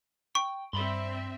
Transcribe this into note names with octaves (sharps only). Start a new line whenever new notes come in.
G5 C#6
G2 C4 D5 E5 B5 C6